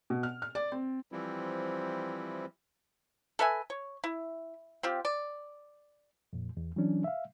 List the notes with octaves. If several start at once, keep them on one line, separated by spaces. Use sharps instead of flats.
B2
F6
F6
D5
C4
E3 F3 G3 C4 E4
A4 B4 E5 G#5
C#5
E4
C4 F4 G4
D5
F2 A#2
E2
E3 F#3 C#4 D4
E5 F5